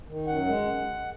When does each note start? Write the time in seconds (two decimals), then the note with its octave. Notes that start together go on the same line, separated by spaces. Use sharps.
0.08 D#3
0.27 F#2 F#5
0.46 G#3